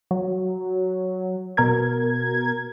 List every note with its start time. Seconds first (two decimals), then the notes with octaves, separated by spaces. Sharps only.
0.11 F#3
1.57 B2 A#4 G#6